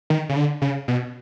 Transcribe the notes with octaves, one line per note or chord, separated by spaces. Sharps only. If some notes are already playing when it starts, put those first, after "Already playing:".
D#3
C#3
D3
C#3
B2